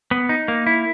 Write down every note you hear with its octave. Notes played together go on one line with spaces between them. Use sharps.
B3
D#4
A#3
E4